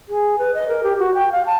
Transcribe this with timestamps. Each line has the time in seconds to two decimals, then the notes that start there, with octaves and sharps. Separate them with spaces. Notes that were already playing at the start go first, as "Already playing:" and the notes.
0.08 G#4
0.38 B4
0.54 D#5
0.68 A#4
0.83 G4
0.99 F#4
1.14 G5
1.32 F5
1.46 A5